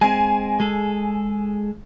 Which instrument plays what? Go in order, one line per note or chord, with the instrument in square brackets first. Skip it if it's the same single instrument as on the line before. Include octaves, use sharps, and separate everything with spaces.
[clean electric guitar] G#3 C4 [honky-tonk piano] G#5
[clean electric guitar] G#3 G#4 A4